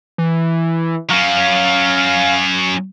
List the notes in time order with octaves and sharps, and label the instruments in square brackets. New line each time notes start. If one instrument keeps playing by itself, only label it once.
[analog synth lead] E3
[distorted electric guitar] F#3 C#4 [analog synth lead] F5